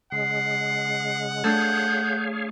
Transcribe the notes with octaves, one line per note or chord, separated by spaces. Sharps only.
C#3 G#3 F#5 C7
A3 D4 G#4 A4 C#5 F5 G6